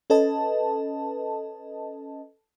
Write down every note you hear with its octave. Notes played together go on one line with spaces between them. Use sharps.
C#4 A4 B4 D#5 A5